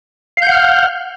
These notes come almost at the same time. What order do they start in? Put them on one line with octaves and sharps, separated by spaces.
F5 G6 F#5 F6